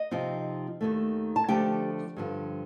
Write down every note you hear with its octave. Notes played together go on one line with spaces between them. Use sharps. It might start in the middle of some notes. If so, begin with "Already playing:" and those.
Already playing: D#5
C3 F3 C4 D#4
D#2 D#3 A3
A5
D3 F3 A3 G4 G5
G2 D3 F3